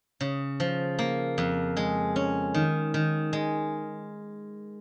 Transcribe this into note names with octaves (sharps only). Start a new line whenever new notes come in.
C#3
F3
A#3
F2
G#3
C#4
D#3
D#3
G#3